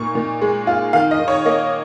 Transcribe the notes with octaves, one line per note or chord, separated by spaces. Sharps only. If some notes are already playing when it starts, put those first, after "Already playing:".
Already playing: A#2 D#4 C#6
A#2
G#3
F4
D#3 F5
D#5
D#3
C#5
A#3 D#5